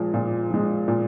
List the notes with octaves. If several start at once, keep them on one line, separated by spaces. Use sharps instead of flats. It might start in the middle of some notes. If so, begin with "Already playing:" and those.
Already playing: A#2 F3 G#3
A#2
F3 G#3
A#2